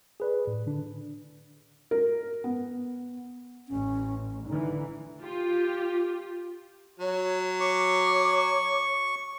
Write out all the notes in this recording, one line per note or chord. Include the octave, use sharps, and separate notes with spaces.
G#4 B4 D5
A2
D3 D4
A#4
B3
A1 C#4
D3 E3 D#4
F4 G4
F#3 C#5
C#5 C#6 D6